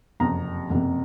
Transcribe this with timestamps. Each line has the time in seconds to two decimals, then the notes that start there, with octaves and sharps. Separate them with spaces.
0.20 F#1 F2 C3 A#5
0.70 F#1 F2 C3